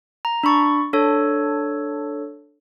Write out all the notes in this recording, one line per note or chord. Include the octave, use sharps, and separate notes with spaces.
A#5
D4 B5 C#6 A6
D4 A4 C#5